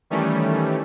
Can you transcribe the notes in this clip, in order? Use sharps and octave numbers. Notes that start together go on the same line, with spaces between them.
D#3 E3 G3 A3 C#4